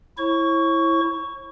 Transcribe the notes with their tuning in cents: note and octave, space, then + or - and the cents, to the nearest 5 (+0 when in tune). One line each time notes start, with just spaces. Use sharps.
E4 +0 C#5 -40 C#6 +10